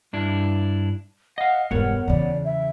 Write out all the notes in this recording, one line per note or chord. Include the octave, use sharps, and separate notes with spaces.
G2 D4 E4
D#5 F5 F#5
E1 G2 B3 A#4 C#5 F#5
E2 C#3 D5
E5